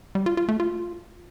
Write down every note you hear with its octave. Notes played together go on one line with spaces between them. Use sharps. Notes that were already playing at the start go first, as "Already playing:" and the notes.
G3
F4
F4
A3
F4